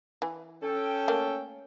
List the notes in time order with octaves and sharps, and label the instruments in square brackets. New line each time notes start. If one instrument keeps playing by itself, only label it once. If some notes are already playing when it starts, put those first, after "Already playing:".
[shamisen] E3
[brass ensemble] C#4 G5 [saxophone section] A4
[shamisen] A3 A#3